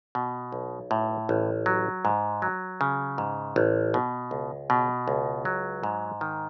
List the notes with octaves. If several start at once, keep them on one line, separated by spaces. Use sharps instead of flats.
B2
B1
A2
A1
F#3
G#2
F#3
C#3
G#2
A1
B2
C#2
B2
C#2
F#3
G#2
D#3